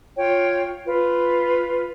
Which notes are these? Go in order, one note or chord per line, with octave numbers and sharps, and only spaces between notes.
F4 C#5 G5
F4 B4